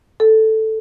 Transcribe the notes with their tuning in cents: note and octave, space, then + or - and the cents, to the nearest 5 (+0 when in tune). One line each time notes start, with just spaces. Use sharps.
A4 +0